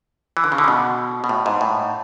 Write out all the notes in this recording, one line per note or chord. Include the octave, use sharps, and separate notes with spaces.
E3
D3
C#3
D3
C#3
B2
B2
A2
G#2
A2